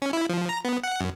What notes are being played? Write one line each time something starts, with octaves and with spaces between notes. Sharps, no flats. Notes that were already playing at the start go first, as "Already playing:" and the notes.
C#4
E4
F3
A#5
B3
F#5
F#2